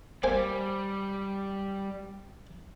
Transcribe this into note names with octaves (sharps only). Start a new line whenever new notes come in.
G3 A#3 C5 G#5